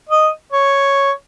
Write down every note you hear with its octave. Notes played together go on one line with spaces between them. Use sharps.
D#5
C#5